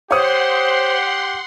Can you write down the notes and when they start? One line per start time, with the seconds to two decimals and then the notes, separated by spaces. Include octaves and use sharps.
0.11 G4 C5 C#5 F#5 C6 D#6